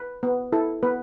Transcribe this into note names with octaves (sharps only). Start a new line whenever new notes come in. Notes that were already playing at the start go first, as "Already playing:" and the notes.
Already playing: B4
B3
E4 A4
B3 B4